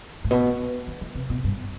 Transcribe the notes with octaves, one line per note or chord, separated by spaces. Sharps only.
A2
B2
E3
E3
C3
B2
G2